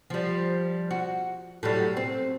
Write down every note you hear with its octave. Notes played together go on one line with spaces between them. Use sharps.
F3 G3
F#4
A2 F#3 G3
C4